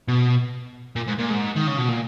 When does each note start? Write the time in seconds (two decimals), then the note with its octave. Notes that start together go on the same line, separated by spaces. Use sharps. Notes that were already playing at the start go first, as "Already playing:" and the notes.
0.08 B2
0.96 A#2
1.08 G#2
1.19 A#2
1.30 G#2
1.57 D#3
1.67 C#3
1.78 B2
1.89 A#2